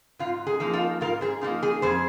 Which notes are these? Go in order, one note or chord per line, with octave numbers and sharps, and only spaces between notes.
G#2 F4
G#4
F3 A#3 D#4
F4 A#4
G#2 F4 A#4
G#4 C5
F3 A#3 D#4 F4 A#4
G#4
F2 G#4 C5